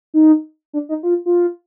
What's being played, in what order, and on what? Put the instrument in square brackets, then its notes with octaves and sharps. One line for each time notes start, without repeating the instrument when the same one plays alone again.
[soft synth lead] D#4
D4
D#4
F4
F4